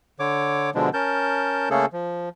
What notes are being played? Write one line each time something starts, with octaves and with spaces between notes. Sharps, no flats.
D3 C#5 D6
B2 D3 F3 G#3 D4
C#4 A#4 A5 G6
C#3 A3 A#3 C#4 G#4 A4
F3